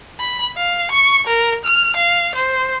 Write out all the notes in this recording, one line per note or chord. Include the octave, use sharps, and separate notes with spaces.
B5
F5
C#6
A#4
F6
F5
C5